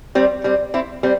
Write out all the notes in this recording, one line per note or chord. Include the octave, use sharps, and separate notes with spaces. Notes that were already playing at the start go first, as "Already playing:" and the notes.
G3 C4
G3 C4
C4 E4
G3 C4